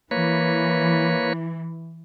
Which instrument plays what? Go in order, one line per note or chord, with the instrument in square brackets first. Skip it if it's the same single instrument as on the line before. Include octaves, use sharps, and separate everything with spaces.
[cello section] E3 [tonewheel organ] A#3 B4 C#5